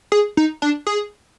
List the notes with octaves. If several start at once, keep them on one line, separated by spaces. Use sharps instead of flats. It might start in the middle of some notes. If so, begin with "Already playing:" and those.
G#4
D#4
D4
G#4